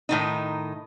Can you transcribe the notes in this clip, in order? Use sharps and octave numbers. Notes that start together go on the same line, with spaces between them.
A2 D#3 D#4